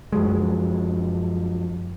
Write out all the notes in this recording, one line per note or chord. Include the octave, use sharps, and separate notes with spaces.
F#2 F3 F#3 G#3